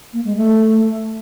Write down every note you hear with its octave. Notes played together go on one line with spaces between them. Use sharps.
A#3
G#3
A3